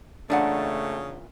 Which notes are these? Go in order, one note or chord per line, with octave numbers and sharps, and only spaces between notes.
E2 A#2 C#3 A3 D4 F#5